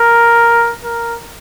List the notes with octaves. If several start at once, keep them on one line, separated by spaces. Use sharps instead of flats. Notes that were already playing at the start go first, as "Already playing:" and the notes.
Already playing: A#4
A#4